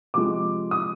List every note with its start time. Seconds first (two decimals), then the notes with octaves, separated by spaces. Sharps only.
0.14 C3 F3 G#3 D6
0.71 D#6